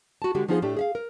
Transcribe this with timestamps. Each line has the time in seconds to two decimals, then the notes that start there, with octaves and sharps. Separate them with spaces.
0.22 F#4 A5
0.35 D3 G#3 F#4 G4
0.48 F3 B3 D#4 F4 G#4 C5
0.62 A2 A3 D4 G4
0.77 G#4 E5 F5
0.95 A#4